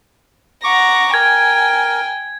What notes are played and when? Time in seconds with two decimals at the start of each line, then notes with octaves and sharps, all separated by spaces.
0.64 F#5 A#5 C#6 D6
1.14 A#4 G5 G#5 G#6